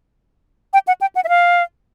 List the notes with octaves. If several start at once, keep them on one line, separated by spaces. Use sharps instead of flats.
G5
F#5
G5
F#5
E5
F5